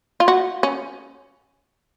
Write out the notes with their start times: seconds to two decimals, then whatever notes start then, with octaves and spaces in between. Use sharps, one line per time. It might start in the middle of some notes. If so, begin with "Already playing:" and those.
0.20 F4
0.28 F#4
0.63 C#4